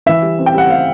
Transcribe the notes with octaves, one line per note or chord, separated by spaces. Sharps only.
E3 E5
G3
C4
G5
G3 F#5
G3 F5